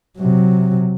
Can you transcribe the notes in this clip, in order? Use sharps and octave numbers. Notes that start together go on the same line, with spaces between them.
C3 F#3